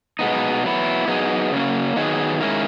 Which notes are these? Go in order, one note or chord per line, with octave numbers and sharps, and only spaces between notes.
B2 G#3 B3 D#4
F#3 B3 E4
F#3 B3 D#4 G#4
C#3 F#3 A#3 C#4
D#3 F#3 B3 D#4 G#4
D#3 G#3 C#4 E4 A#4